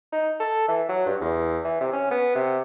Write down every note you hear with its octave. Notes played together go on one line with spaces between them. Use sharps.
D#4
A4
E3
F#3
G2
E2
E3
C3
C#4
B3
C3